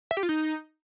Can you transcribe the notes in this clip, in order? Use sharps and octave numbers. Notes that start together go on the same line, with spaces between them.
E5
G4
F4
D#4